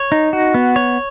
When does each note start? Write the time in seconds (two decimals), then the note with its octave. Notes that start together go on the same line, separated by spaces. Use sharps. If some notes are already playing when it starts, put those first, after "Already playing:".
Already playing: C#5
0.12 D#4
0.33 F#4
0.54 B3
0.76 C#5